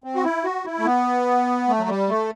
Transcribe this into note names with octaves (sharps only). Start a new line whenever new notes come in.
C4
F#4
E4
F#4
E4
A3
B3
A3
F#3
G3
A3